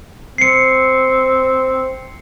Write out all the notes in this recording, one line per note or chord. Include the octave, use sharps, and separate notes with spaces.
C4 C7 C#7